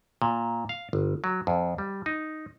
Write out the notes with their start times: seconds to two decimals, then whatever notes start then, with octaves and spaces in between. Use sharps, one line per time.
0.22 A#2
0.69 F5
0.93 G1
1.24 F#3
1.47 F2
1.78 G3
2.06 D#4